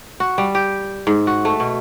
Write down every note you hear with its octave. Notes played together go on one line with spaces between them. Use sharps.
F#4
G3
G4
G#2
F#4
A3
B2